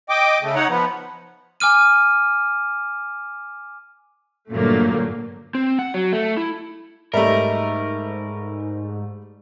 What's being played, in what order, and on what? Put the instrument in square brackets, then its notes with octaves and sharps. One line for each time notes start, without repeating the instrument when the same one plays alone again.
[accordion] D#5 G5 D6
C#3 A3
D#4 C#5 F#5
F3 B3
[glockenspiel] G#5 D6 F6 D#7
[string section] G2 A#2 D3 F#3 A3 A#3
[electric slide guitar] C4
F#5
F#3
A3
E4
[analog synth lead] G#2 [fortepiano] G3 A3 [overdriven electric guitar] A#4 [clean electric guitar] D#5 E5